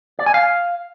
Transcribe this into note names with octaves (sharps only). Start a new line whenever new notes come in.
D5
G#5
F5